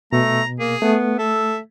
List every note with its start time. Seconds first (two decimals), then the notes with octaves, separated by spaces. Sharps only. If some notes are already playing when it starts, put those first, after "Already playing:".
0.13 B2 A3 A#5
0.59 A#3 G#4
0.82 A3 B3
1.19 A4 E5